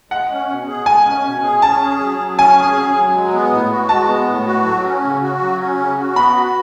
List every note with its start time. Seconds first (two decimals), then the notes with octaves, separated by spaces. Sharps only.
0.10 G#3 F#5
0.30 C#4
0.48 B2
0.68 G#4
0.86 G#3 G#5
1.06 C#4
1.25 B2
1.43 G#4
1.62 C#4 A5
1.81 G#4
2.00 F#3
2.19 F#3
2.38 C#4 G#5
2.57 G#4
2.75 F#3
2.95 F#3
3.14 G#3
3.33 B3
3.52 A2
3.71 F#4
3.89 G#3 A5
4.08 B3
4.28 A2
4.46 F#4
4.64 F#3
4.84 C#4
5.03 C#3
5.22 F#4
5.41 F#3
5.60 C#4
5.78 C#3
5.98 F#4
6.16 B3 B5
6.35 F#4